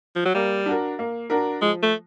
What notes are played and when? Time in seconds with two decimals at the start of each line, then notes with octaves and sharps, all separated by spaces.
0.16 F3
0.25 F#3
0.35 G3 A#3
0.66 D4 F#4 A#4
0.99 A#3
1.30 D4 F#4 A#4
1.62 F3 G#3
1.83 A3